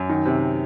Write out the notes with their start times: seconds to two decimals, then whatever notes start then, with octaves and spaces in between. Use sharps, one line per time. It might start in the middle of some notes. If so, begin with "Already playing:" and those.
Already playing: F#2
0.09 D#3
0.26 C3